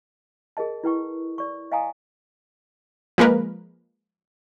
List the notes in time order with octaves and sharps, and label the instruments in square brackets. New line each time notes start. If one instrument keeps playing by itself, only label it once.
[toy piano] G#4 A#4 D#5 A5
E4 B4 G5 C#6
D5 C#6
D#5 F5 G5 G#5 A#5 D#6
[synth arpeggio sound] F3 G#3 A#3 A#4 B4